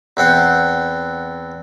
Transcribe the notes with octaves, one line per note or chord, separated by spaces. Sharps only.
E2 C4 F#5 C6